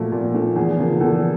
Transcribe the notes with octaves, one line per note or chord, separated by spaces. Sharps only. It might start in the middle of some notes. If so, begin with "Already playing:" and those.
Already playing: A#2 F3 A3 F#4
A#2
F3 A3
E2 G#4
C#3 F3 A#3
E2 A4